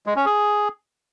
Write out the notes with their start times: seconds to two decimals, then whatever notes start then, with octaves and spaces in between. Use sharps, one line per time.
0.06 G#3
0.16 C#4
0.26 G#4